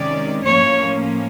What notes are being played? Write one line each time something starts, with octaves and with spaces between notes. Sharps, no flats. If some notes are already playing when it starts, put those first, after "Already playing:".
Already playing: C3 D#3 G#3 C#4 D5
A2 F3 A#3 C#4 C#5